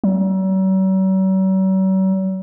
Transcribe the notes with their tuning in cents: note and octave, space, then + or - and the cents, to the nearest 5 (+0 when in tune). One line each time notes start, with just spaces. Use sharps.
F#3 +45